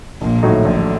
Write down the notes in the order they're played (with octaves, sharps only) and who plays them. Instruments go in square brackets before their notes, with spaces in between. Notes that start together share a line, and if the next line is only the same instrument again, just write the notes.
[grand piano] A#1 [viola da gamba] A#2
[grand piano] A2 F#3 A3 D#4
[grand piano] A#1 [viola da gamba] D3